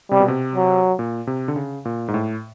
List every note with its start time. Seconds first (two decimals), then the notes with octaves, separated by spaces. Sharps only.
0.11 C3 G3
0.20 B2
0.28 C3
0.55 F#3
0.99 A#2
1.27 C3
1.48 D3
1.56 C#3
1.85 A#2
2.08 G#2
2.14 A2